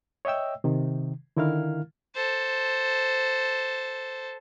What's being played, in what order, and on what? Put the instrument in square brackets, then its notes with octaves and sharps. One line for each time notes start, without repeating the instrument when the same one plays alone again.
[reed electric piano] C#5 D#5 E5 G5 E6
C3 D#3
D3 D#3 E4 A#4 F5 F6
[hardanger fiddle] A4 C5